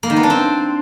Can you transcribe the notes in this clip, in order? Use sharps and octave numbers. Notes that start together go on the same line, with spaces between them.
A#3
D#3
B3
D4
C4